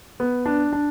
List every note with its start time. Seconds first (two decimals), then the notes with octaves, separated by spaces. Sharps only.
0.20 B3
0.46 D4
0.73 D4